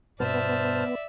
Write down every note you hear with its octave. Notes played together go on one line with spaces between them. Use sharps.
G2 B2 B3 C5 D5 E5 A5 F6